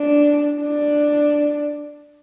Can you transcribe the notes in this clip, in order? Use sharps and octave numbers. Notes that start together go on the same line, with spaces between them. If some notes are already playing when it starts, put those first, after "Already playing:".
Already playing: D4
D4